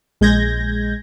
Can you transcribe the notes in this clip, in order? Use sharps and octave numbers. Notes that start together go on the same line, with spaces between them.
A#1 G#3 G6 G#6 A#6